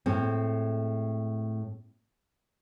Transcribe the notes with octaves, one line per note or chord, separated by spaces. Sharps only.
A2 G#3 C4